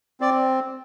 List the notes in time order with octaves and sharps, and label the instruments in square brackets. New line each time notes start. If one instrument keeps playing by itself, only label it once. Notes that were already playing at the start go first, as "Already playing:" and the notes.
[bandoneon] C4 D5